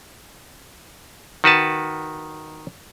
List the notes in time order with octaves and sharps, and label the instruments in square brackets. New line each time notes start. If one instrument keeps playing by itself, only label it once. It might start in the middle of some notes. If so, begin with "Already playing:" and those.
[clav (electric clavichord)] D#3 F#4 B4 A5